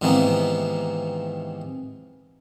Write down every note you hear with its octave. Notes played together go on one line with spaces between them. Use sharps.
G#2 C3 D#3 E3 A#3 B3